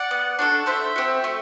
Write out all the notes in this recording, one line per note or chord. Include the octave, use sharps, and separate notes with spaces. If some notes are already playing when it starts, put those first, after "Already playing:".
Already playing: D5 F#5
B3
D4 F#4 A4
A3 C5 E5
C4 F#4
A3